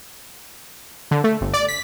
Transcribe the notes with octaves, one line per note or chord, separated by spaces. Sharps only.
D3
A3
G1
D5
B6